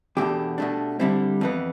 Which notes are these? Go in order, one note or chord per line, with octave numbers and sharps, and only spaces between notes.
E2 B2 A3 D4 G4
B2 A3 D4
D3 G3 C4 E4
F2 E3 B3